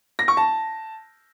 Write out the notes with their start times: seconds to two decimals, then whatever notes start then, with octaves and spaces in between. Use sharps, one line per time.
0.19 A#6
0.28 C#6
0.37 A5